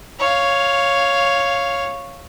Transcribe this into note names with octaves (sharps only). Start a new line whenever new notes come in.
C#5 F5